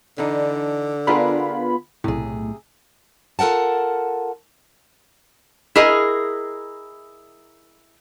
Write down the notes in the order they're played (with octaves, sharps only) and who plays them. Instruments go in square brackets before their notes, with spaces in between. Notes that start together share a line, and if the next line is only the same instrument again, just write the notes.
[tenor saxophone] D3 [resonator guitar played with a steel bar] E3 D4 D#4
[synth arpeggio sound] B3 F4 B5 [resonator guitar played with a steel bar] D4 G#4 A#4
[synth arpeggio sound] B1 A2 [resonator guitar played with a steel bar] C3 G#4
[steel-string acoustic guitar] F4 A4 A#4 F#5 A5
[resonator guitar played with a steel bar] E4 G#4 A#4 D#5